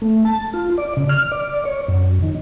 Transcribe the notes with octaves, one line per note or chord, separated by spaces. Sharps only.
A3
A5
F4
D5
C#3
F6
D5
C#5
F#2
D#3